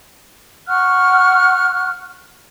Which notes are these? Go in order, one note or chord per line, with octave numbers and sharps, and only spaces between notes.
F#5 C#6 F6 F#6